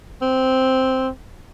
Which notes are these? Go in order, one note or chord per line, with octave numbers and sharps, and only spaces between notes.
C4